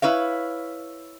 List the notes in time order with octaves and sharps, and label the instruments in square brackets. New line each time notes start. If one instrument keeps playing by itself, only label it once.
[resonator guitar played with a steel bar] E4 B4 C#5 F5